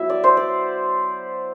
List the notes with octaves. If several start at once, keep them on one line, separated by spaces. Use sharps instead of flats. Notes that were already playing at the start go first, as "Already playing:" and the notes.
Already playing: F#3 B3 E4 E5
D5
C5
D5